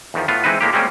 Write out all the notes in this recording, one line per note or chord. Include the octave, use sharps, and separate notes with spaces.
E2 D#3 F3
A2 B3 F4
E3 G#3 C4 D#4 B4
A2 G#3 A#3 G4
G3 G#3 A#3 C4 C#4